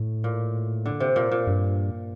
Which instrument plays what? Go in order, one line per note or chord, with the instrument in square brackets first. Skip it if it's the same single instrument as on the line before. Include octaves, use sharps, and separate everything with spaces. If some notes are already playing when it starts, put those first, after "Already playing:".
Already playing: [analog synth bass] A2
[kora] A#2
D3
C3
A#2
A#2
[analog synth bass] G2